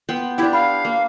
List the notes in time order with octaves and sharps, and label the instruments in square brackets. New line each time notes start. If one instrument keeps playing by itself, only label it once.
[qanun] B3 G5 C6
[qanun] D4 G4 [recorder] E4
[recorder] F5 [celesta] B5
[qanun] A#3